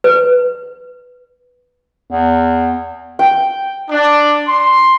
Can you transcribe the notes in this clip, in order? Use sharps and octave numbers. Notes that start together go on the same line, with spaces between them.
B4
E2
G5
D4
C6